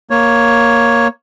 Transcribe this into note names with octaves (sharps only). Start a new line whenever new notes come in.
A#3 C#5